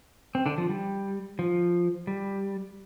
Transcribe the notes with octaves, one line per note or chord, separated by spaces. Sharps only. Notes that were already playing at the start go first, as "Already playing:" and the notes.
C4
D3 D4
F3
G3
F3
G3